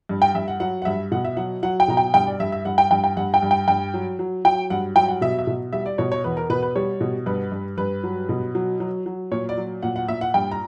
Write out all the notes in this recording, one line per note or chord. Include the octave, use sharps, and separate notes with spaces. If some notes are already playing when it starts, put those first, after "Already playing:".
G2
G5
G2 E5
F#5
F#3 F#5
F#5
G2 E5
B2 F#5
E5
F#3 F#5
F#3 F#5
G5
B2 A#5
G5
G2 G5
D5
G2 E5
E5
G2 F#5
G5
G2 G5
G5
G2 F#5
G5
G2
G5
G2 G5
F#3
F#3
F#3 G5
G2 F#5
F#3 G5
F#5
B2 E5
E5
B2
G3 E5
D5
B2 C#5
C#5
E2 B4
A#4
B2 B4
B4
G3 C#5
B2
G2 B4
G2
G2 B4
F#3
B2
F#3
F#3
F#3
A#2 C#5
D5
F#3
A#2 F#5
F#5
A#2 E5
F#5
G2 G5
A#5